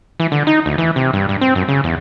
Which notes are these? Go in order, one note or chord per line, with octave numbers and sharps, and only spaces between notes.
E3
D3
D#4
D2
E3
C3
G2
G2
C4
F#2
C#3
E2